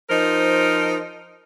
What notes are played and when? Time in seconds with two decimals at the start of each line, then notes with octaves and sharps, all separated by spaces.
0.10 F3 D#4 A#4 C5